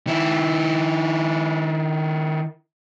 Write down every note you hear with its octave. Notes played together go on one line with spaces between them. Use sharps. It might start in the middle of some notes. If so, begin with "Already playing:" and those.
D#3 E4